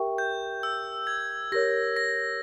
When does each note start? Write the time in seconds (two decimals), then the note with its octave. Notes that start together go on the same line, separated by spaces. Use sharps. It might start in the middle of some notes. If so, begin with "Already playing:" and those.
Already playing: G4 A#4 E5 G5 C#6
0.18 G6
0.63 E6
1.07 G#6
1.52 G4 A#4 C#5 A#6
1.97 A#6